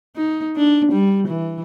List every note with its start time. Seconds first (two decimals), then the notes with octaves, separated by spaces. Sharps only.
0.16 D#4
0.57 D4
0.92 G3
1.27 E3